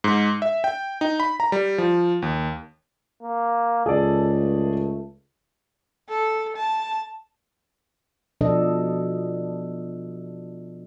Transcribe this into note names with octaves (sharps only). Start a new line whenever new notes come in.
G#2
E5
G5
D#4
B5
A#5
G3
F3
D#2
A#3
C#2 G#4 A4 D5
A3
A4
A5
B2 F3 D4 A4 D#5